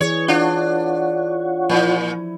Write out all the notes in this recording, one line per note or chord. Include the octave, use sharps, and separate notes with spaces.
E3 G#4 C#5
D4 F4 C#5 F#5
A#2 F3 E4